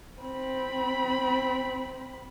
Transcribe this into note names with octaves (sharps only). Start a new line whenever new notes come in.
C4 B5